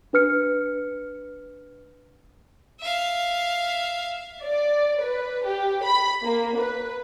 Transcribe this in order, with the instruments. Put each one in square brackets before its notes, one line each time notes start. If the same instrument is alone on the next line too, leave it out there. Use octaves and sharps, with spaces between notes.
[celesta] D4 B4 F6 C#7
[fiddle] E5 F5
[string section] D5
B4
G4
B5
A#3
B4